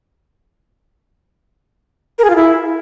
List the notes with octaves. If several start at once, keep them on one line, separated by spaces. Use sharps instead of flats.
A#4
G#4
F4
E4